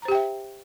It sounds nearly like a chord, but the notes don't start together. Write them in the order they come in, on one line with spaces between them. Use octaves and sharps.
A#5 C5 G4 G5 E5